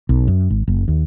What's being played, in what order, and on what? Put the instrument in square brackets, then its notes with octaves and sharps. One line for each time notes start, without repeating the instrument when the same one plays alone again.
[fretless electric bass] B1
F#2
G#1
F#1
D#2